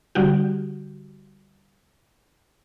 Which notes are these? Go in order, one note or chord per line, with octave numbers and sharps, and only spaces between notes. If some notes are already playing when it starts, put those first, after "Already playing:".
D3 G3 F#4 G4